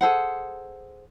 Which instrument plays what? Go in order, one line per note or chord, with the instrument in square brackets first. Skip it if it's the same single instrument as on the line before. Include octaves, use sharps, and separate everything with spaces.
[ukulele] G#4 A4 C5 F#5